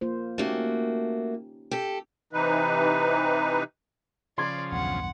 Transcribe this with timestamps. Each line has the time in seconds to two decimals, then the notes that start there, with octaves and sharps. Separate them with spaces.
0.01 A#3 F4 C5
0.38 A3 A#3 C#4 D#4 F#4 G4
1.71 G4 A4
2.33 C3 E3 D#4 B4
4.38 C#3 F3 D5 C6 G#6
4.72 B1 E2 G2 F#5